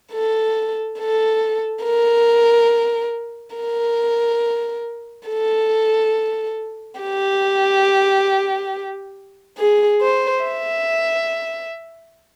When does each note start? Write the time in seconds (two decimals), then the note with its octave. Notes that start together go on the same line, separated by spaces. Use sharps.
0.13 A4
1.00 A4
1.85 A#4
3.56 A#4
5.28 A4
7.01 G4
9.58 G#4
10.02 C5
10.44 E5